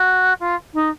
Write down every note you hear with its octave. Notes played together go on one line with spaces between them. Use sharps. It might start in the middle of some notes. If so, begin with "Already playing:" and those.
Already playing: F#4
F4
D#4